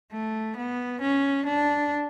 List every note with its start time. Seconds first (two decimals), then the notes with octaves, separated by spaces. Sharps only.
0.13 A3
0.57 B3
1.02 C#4
1.46 D4